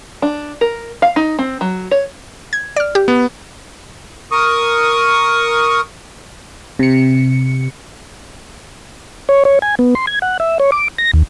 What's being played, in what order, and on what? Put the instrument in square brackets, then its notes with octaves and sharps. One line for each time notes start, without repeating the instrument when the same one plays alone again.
[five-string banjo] D4
A#4
F5
D#4
C4
F#3
C#5
[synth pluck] G#6
D5 F6
G4
[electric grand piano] B3
[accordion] A#4 C#6 D#6
[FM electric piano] C3 C#7
[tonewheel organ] C#5
C#5
G#5
B3
C6
G#6
F#5
E5
C#5
D6
A#6
D#2